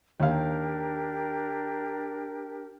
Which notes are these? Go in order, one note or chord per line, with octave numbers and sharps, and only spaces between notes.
D#2 D4 G4 A#4 F5